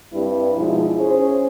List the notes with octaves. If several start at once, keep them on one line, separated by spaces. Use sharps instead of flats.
G2 G3 C4 E4 B4
B2 F3 G#3 D#4 E4
C#4 G#4 C5